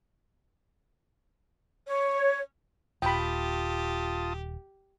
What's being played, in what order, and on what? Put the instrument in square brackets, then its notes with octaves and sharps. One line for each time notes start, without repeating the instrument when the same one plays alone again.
[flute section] C#5
[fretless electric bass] D#1 [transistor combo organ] F4 A5 D#6 [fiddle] G4 [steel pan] G5 B5